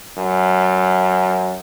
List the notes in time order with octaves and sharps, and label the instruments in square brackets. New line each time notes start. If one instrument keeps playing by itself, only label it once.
[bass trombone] F#2